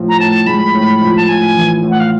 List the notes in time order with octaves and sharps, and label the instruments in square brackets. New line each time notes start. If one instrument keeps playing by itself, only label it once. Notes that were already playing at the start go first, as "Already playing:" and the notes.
Already playing: [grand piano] A2 F3
[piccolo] A#5
[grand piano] A2 [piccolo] A5
[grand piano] G#3 [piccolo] B5
[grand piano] A2
F3
[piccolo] A5
[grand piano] A2 [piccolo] G#5
[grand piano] E3
A2
[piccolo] F#5
F5